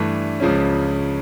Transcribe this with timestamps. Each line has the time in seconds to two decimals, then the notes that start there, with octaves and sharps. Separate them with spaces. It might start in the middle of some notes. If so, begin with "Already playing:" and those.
Already playing: G2 E3 A3 D4
0.40 C#2 C#3 F3 C#4